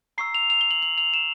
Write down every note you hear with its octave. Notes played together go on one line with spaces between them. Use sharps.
A#5 C#6 E6 C7
F7
F7
G7
F#7
F#7
F7
E7